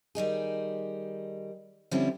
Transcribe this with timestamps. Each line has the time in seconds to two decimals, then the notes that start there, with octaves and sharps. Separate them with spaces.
0.15 D#3 G3 D#4 G#4
1.91 D3 F3 G3 C4 C#4 E4